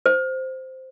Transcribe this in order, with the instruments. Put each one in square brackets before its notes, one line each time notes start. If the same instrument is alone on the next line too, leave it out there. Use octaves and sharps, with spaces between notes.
[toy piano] C5